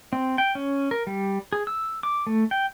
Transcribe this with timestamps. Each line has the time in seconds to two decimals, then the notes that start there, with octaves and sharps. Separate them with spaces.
0.13 C4
0.38 G5
0.55 C#4
0.91 A#4
1.07 G3
1.53 G#4
1.67 E6
2.03 D6
2.27 A3
2.51 G5